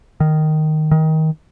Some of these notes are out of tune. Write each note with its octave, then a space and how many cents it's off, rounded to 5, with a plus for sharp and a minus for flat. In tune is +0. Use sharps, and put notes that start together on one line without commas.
D#3 -5
D#3 +20